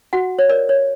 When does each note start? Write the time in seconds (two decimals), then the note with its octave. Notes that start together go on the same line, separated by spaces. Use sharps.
0.13 F#4 F#5
0.39 C#5
0.49 A#4 D5
0.69 C#5